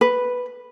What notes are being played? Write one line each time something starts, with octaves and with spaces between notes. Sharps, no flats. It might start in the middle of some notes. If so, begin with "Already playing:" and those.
B4